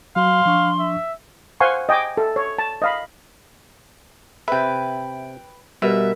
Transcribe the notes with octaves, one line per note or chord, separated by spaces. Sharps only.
F#3 F#4 F5 C6
F3 D4 C#6
E5
C5 F5 F#5 G#5 C6 C#6
D#5 G5 G#5 D6
A4
C#5
A5
D#5 F5 B5
C3 B4 E5 G5 G#6
B2 G3 A#4 B4 E5 B5